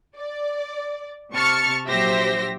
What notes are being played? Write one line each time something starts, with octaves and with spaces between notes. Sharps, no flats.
D5
C3 A5 C#6 F6 A6 C#7
A#1 F#3 G4 C5 E5 A#6